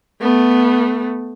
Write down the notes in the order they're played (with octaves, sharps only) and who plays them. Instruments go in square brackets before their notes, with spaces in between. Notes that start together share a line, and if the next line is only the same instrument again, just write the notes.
[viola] A3 B3